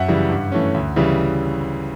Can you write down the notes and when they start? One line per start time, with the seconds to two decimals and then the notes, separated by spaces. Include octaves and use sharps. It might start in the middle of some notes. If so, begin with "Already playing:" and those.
Already playing: F#2 E5 F#5
0.08 C#3 E3 G3
0.30 G2
0.52 E3 A3 C#4
0.74 D2
0.96 C#3 E3 G3